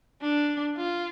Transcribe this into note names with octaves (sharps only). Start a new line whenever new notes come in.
D4
F4